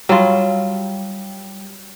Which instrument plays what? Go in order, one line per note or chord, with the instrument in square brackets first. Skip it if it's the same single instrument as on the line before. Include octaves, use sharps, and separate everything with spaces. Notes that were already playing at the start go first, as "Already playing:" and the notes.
[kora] F#3 F4 [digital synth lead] G3